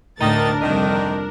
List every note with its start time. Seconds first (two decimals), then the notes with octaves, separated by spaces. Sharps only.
0.20 D2 A2 D#3 D4 D#4 A#4 A6
0.61 C2 F2 D#3